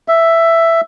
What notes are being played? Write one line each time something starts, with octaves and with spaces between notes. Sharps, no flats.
E5